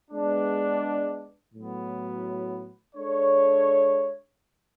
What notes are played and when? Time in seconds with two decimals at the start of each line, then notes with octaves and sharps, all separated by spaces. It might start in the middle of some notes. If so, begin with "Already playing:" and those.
0.11 G#3 B3 D4
1.53 A2 F#3 B3
2.96 G#3 D4 A4 C#5